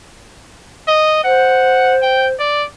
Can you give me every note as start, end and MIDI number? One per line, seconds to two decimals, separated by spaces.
0.88 1.23 75
1.24 2.33 72
1.24 1.96 78
2.02 2.27 79
2.39 2.65 74